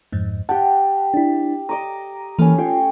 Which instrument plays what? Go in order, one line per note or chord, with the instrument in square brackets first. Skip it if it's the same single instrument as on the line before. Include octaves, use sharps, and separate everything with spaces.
[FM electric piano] F2 G#2
[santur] G4 G5 [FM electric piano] F#5 A5
[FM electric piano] D4 E4
[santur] D#5 D6 D#6 [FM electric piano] A#5
[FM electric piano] E3 A#3 [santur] A3 C#4
[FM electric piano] F4 [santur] C#5 G5